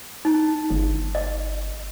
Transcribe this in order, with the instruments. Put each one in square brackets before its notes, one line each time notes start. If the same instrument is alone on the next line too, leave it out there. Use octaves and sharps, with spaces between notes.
[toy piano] D#4
[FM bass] G1
[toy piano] D#5